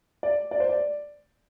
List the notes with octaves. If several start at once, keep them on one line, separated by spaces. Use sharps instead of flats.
D5
D5
C5
D5